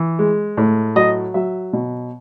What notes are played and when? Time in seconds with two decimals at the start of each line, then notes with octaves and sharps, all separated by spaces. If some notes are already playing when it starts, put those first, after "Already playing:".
Already playing: E3
0.19 G#3
0.57 A2
0.96 F#3 D#5
1.34 F#3 E5
1.73 B2